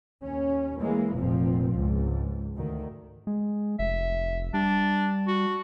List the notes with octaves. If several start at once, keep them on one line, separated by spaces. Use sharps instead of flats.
D#2 C#4
E3 G#3 A#3
F1 A#2 F3 C4
C#2 G#2
D2 D#3
G#3
F1 E5
G3 D4
F#4